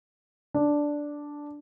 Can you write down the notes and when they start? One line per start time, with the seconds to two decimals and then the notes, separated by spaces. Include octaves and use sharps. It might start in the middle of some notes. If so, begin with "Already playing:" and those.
0.54 D4